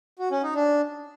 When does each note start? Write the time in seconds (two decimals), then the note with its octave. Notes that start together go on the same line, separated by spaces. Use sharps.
0.19 F#4
0.31 C#4
0.43 D#4
0.55 D4